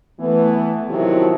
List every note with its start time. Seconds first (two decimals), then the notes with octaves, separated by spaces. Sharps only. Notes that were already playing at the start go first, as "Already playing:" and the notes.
0.20 E3 A3 B3
0.89 C3 D#3 F3 F#3 E4 F#4